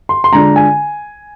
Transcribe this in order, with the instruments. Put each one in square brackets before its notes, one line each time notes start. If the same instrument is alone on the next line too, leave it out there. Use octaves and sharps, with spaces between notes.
[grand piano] C6
C6
D3 G#3 D4 F4 A#5
G#5